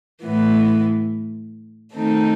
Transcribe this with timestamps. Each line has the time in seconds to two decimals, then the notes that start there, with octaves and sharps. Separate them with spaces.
0.22 A2 E3 B3
1.94 D#3 A3 C4 D#4 A4